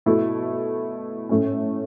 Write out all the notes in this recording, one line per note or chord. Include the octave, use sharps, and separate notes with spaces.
B2 A3 E4
A2 A3 C#4